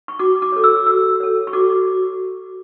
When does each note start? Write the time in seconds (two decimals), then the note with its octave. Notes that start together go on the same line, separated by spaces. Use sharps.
0.08 C#6
0.19 F#4 D6
0.42 D6
0.52 A4 C#5
0.64 E6
0.86 F#4 E6
1.20 A4 C#5
1.47 C#6
1.53 F#4 D6